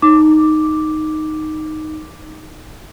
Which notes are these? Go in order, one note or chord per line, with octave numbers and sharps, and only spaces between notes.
D#4 D6